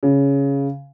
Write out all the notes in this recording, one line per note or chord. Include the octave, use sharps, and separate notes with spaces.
C#3